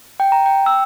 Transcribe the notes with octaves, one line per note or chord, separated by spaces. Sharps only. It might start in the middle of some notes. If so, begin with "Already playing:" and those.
G5
A#5
G5
E6